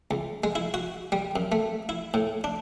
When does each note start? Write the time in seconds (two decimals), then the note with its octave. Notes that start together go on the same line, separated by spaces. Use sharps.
0.11 C#2
0.44 G#3
0.55 E4
0.74 F#4
1.12 G3
1.36 F#2
1.52 A3
1.89 E4
2.14 A2
2.44 D4